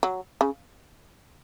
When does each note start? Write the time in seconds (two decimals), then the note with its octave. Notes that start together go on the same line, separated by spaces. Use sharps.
0.03 F#3
0.41 C#3